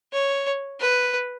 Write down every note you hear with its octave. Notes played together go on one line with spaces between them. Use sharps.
C#5
B4